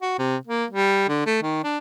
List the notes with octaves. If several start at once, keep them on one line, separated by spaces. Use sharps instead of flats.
F#4
C3
A#3
G3
D3
A3
D#3
D4